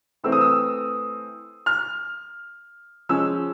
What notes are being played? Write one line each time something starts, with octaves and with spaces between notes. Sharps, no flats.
E3 A3 C4 E6
D#6
E6
F6
F3 G#3 C#4 E6